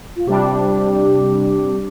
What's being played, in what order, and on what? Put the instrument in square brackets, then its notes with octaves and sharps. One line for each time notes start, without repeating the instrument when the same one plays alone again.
[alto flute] F4
[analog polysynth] C3 G3 D4 [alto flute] G4